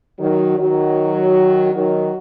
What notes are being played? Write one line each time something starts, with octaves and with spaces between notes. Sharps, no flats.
D#3 F#3
D#3 F#3
D#3 F#3